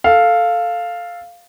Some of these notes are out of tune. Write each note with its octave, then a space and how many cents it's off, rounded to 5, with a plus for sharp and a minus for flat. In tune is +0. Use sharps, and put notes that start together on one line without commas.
A4 +5 F5 +0